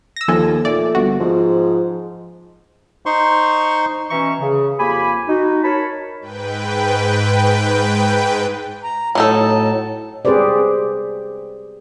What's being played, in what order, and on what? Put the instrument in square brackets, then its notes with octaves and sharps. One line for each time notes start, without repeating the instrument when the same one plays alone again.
[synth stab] E6 A#6
[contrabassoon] D#2 [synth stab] F3 A4 G#5
[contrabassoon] A#2 [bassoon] A3 [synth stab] D5
[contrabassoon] G1 [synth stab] F#4
[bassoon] G#2 [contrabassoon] F3
[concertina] D#4 C5 C6 C#6
[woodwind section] B2 E3 C#4 E5 A#5 C#6
C#3
F2 A#3 G4 G#5 B5
D#4 F#4
A#4 C#5 A5 B5
[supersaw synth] G#2 B4 G5
[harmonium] A#5
[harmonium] A2 A5 [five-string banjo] F#3 D#4 A4
[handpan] C4 G4 G#4 B4 C5 D5